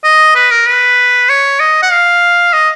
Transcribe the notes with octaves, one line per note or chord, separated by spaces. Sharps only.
D#5
B4
A#4
B4
C#5
D#5
F#5
F5
D#5